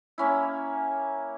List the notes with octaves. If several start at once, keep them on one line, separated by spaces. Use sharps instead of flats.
A#3 C#4 E4